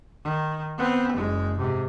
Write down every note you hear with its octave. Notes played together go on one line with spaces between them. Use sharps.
D#3
B3 C4
F#1 G#3
G#2 C3